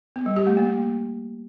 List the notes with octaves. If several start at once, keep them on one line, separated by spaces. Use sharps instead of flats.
B3
G3
G4
A3
A#3